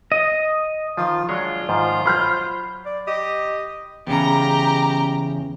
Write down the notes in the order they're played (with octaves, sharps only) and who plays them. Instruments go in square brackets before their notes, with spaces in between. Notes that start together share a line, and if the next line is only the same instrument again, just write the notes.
[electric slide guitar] D#5
[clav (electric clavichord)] D#3 F3 [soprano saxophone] F4
[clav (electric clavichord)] F#3 G#3 C#5 [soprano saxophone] D4 [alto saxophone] F4
[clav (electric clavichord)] G#2 D#3 F3 [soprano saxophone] C5
[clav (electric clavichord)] F#3 [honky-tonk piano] B5 F6 G6
[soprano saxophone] D5
[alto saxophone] G4 [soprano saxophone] D#5
[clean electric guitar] E2 C#3 [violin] G4 A#5